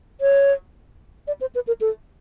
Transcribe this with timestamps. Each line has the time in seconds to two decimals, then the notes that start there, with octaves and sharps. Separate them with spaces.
0.21 C#5
1.27 D5
1.41 C5
1.55 B4
1.67 A#4
1.81 A4